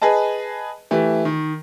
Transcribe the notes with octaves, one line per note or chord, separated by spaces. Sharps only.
G#4 B4 D#5 A5
E3 A3 G4
D#3